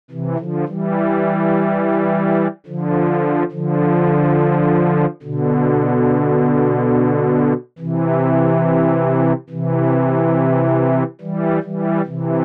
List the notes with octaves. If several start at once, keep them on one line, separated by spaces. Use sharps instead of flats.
C3 E3
D3 F3
E3 G3
D3 F3
D3 F3
B2 D3
C3 E3
C3 E3
E3 G3
E3 G3
C3 E3